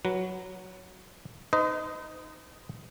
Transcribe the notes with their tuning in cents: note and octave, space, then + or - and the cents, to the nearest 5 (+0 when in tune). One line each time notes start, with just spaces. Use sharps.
F#3 +0 B4 -10
D#4 +0 C5 -45 D#5 +0